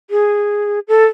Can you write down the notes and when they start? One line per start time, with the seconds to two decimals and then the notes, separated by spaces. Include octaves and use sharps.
0.10 G#4
0.88 A4